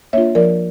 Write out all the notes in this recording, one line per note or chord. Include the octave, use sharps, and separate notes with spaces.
A#3 D4 F4 C#5 E5
F3 A#4 D5